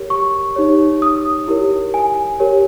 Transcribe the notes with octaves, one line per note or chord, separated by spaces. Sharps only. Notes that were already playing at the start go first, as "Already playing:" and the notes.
Already playing: G4 A#4 C#5
C#6
D#4 G4 C#5
D#6
E4 G4 A#4 C#5
G#5
G4 A#4 C#5